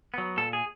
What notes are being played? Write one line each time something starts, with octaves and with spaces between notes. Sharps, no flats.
F#3 B3
A#2 A4
G#4